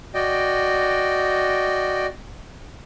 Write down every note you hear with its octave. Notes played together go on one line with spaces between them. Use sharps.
F#4 D5 D#5 G5